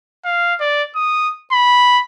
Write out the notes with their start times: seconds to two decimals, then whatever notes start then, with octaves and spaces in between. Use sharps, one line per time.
0.25 F5
0.60 D5
0.96 D#6
1.52 B5